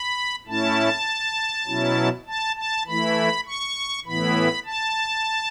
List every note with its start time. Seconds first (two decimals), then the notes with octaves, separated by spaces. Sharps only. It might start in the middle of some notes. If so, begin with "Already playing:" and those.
Already playing: B5
0.47 A2 A3 C#4 E4 A5
1.67 B2 F#3 C#4 E4
2.27 A5
2.56 A5
2.87 E3 A3 E4 B5
3.46 C#6
4.06 A2 E3 B3 E4 B5
4.66 A5